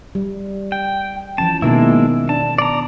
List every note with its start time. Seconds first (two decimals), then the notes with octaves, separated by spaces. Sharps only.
0.15 G3
0.72 G5
1.38 E3 F3 C#4 A5
1.62 B2 D#3 G#3 A#3 B3 E4
2.29 D4 A5
2.58 D5 A#5